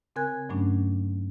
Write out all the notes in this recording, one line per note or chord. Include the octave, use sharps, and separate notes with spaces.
C#3 C4 A#4 G#5 F#6 G#6
G2 F#3 A3 C#4 D4